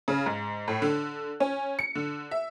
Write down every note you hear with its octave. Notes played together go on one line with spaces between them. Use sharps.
C#3
G#2
A2
D3
C#4
C#7
D3
E5